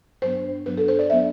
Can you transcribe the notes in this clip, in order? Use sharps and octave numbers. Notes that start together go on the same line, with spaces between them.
G2 F#3 B3 D4 C5
G2 F#3 B3 D4 B4
A4
C5
D5
F#3 B3 D4 E5